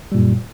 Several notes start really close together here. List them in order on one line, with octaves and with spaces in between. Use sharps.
G3 A#2 F#2